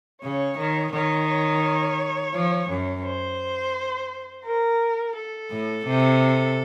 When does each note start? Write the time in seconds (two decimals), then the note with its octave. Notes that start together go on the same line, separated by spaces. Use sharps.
0.22 C#3 C#5
0.58 D#3
0.93 D#3 C#5
1.29 C#5
2.34 F3
2.69 F#2
3.04 C5
4.45 A#4
5.16 A4
5.51 A2
5.86 C3